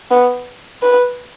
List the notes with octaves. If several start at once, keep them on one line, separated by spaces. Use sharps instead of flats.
B3
B4